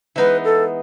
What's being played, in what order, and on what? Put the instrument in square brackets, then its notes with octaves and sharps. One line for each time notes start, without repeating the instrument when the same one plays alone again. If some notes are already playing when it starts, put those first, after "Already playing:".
[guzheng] E3 G#3 B3 D#4 [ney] B4
[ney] A4